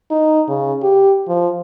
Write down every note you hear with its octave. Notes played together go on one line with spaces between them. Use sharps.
D#4
C#3
G4
F3